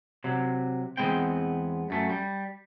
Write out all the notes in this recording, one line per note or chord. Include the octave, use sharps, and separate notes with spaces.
C3 F#3
E2 F#3 G#3 B3 C4 G5
F#2 A3
G3